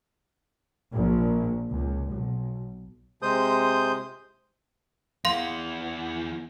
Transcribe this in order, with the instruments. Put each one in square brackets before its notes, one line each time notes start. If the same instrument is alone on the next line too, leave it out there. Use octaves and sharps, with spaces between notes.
[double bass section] A#1
C#2
B1
[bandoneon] C3 G#3 C5 D#6 G6
[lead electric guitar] E2 E3 [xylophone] F5 C6